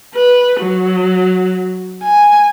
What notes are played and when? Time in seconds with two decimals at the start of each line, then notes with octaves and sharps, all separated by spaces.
0.15 B4
0.61 F#3
2.03 G#5